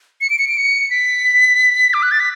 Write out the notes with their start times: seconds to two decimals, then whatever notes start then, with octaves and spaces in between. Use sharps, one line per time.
0.21 C#7
0.30 D7
0.39 C#7
0.48 D7
0.58 C#7
0.90 B6
1.94 D6
2.02 F#6
2.11 A6
2.20 B6